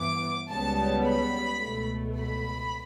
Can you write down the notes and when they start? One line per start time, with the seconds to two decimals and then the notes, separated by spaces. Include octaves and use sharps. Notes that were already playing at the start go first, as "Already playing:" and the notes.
Already playing: G2 E3 B3 D6
0.49 C#2 C#3 G3 B3 A5
1.04 B5
1.61 C#2 B2 A3
2.17 B5